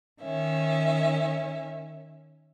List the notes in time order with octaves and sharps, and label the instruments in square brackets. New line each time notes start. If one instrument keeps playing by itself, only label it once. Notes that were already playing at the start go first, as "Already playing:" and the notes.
[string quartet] D#3 C#4 E5